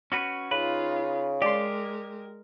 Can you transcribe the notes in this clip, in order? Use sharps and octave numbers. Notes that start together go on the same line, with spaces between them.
C#4 F#4 B4
C#3 D#4 F4 B4
G#3 G4 A#4 D5 C6